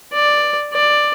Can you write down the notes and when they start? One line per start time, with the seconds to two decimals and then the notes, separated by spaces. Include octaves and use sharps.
0.13 D5
0.73 D5